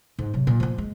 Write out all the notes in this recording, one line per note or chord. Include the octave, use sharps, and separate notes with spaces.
G#2
C3 F#3
A#2
F3 A#3
G#3